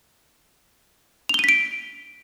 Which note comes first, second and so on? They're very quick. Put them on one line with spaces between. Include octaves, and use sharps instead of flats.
F7 G7 D#7 B6 D7